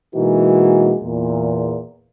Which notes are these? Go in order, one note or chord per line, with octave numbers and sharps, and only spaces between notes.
B2 E3 G#3 A#3 D#4 F#4
E2 A#2